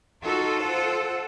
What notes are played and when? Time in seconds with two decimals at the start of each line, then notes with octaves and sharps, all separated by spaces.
0.23 D#4 F4 F#4 A4
0.63 C5 F#5